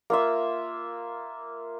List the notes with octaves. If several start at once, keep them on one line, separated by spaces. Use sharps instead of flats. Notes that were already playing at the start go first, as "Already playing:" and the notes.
A#3 F4 E5